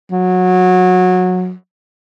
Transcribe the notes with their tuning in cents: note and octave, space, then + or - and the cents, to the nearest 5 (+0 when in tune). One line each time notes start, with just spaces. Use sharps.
F#3 -20